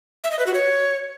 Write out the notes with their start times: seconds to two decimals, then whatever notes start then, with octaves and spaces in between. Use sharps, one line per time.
0.24 E5
0.31 D#5
0.39 B4
0.47 F#4
0.54 C#5